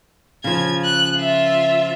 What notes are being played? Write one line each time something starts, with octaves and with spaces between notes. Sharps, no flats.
C#3 F3 G#6
F#6
F4 E5